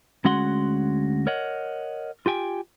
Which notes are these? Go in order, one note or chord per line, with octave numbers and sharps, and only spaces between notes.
D2 G#3 C#4 F#4 F#5 C6
A#4 C#5 D#5 F#5
F4 G4 G5 G#5